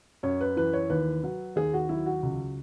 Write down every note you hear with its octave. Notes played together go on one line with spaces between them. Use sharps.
F#2 C#5
B4
E3 B4
C#5
D#2 B4
F#3
D#2 G#4
F#4
F#3 E4
F#4
C#2